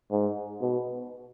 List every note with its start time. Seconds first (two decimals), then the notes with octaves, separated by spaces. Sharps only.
0.11 G#2
0.61 B2